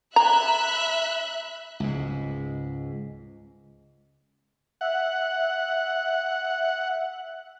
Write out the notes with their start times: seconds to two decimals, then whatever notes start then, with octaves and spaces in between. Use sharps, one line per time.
0.16 E5 A#5 B5 F#6
1.80 C#2 G#2
4.81 E5 F#5